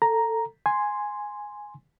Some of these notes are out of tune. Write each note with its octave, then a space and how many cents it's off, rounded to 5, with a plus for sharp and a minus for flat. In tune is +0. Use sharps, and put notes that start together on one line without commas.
A4 +20 A#5 +0
G#5 +0 C6 +0